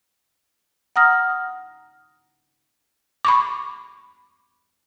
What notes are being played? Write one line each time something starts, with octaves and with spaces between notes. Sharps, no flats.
F#5 A#5 D#6 F6 A#6
B5 C#6 D6